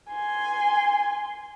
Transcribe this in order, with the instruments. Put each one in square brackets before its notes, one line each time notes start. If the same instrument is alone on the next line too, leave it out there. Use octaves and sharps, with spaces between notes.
[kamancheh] G#5 C6